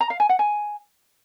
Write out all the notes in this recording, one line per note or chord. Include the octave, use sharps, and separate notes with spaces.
A#5
F5
G#5
F#5
G#5